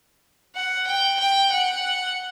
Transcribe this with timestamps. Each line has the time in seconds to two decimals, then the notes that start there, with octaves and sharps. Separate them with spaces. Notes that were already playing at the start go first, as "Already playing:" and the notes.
0.56 F#5
0.87 G5
1.19 G5
1.52 F#5